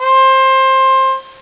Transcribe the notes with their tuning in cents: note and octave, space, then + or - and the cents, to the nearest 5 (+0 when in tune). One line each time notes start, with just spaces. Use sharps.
C5 +20